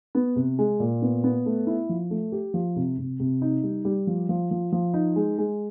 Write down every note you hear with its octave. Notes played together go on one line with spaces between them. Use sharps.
B3
C3
G#3
A#2
B3
B3
A3
E4
F3
A3
G4
F3
C3
C3
C3
D#4
G3
G3
F3
F3
F3
F3
D#4
G#3
G#3